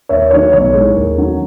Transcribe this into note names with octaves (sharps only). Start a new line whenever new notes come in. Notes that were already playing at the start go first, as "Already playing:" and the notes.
D#2 C#5 E5
D#3 F#3 A3 D#4 C#5
B1 C#5
A2 G#3 D#4
D#2
D#3 F#3 A3 C#4